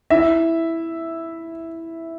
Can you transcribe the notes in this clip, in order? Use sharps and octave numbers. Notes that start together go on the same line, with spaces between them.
E4 E5